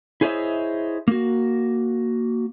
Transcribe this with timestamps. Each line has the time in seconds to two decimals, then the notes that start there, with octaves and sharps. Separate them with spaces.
0.21 E4 G#4 C5 C#5 D#5 E5
1.08 A#3 F#4